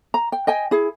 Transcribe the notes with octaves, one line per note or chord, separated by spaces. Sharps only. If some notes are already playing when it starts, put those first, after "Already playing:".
A#5
G5
D#5 G5 G#5
E4 G#4